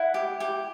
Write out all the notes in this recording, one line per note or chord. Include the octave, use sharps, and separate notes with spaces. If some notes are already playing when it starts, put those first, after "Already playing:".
Already playing: E4 F#5
G4
G4